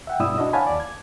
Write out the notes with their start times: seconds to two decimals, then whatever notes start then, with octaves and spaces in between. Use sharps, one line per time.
0.07 E5 F#5 G5
0.20 G2 B2 E4 D5 D#6 E6
0.38 D4 E4 F#4 D#5
0.53 C#5 F5 F#5 G#5 A5 B5
0.67 D#2 D5
0.80 G#6